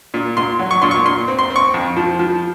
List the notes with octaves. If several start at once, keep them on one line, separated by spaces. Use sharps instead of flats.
A#2
A#2 C6
F#3
C#6
A#2 C6
C#6
A#2 C6
C4
C6
C4
C#6
F2
F3
F3